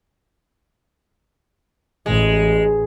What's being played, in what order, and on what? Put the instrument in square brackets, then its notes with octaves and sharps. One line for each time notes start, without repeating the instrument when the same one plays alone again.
[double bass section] A1 [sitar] G#3